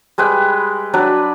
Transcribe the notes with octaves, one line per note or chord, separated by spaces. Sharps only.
G3 G#3 B4 G5
F#3 D4 B4 D5